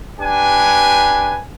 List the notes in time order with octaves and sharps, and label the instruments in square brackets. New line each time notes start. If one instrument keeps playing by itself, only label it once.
[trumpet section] D4 G4 B4 G#5